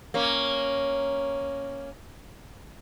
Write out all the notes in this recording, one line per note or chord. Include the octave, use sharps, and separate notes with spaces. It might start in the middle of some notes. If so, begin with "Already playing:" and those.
A#3 C#4